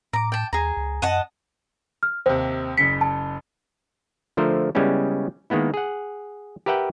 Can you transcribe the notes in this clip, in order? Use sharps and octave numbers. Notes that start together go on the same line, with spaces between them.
A2 A#5 D6
G5 A5
D#2 G#4 A#5
C#2
F#2 D#5 F#5 A5
F6
D#2 C3 C5
F#1 C#3 B6 C#7
A5
D3 F3 A3 A#4 C5
C#3 G3 G#3 B3 C#4 E4
D#3 G#3 A#3 B3 E4
G#4 F#5
G4 A#4 B4 E5 F#5 G5